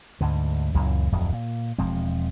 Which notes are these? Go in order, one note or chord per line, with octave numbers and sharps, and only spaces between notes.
D2 G#2 D3
C#2 F#2 A#2 E3
D1 F2 F#3
A#2
E1 F3 G#3 C4